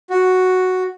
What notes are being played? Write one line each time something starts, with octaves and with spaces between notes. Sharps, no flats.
F#4